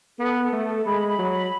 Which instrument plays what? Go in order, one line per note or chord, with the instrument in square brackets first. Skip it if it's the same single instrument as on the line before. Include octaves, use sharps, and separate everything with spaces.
[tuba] B3 [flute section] A4
[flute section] A4
[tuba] A3
[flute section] A4
[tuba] G#3 [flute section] B5
[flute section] B5
[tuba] F#3
[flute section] B5